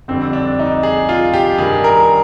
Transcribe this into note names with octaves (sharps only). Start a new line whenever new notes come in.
F2 D3 G3 C4
D4
D#4
G#4
F4
G4
G2 D#3 G3 G#4
A#4